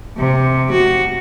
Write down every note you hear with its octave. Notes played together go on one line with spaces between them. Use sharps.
C3
F#4